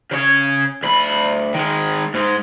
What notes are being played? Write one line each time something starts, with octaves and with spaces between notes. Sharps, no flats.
C#3 C#5
D2 B5
D#3 G#3
G#2 G#3